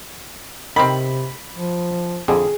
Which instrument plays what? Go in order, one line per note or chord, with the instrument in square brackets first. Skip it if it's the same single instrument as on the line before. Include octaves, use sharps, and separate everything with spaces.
[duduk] C3 [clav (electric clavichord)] D#3 C4 [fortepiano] B5
[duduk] F3
[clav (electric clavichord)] F2 D3 [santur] G#4